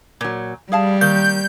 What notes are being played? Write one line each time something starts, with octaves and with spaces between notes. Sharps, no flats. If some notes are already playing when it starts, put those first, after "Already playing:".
A#2 F#3
G3 G#4 F5 A5
D#3 A#3 G6